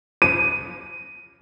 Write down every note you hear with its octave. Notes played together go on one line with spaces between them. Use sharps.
D#7